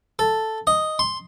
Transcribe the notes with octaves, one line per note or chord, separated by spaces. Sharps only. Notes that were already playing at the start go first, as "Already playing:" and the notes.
A4
D#5
C6